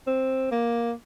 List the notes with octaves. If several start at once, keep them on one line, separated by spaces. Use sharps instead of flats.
C4
A#3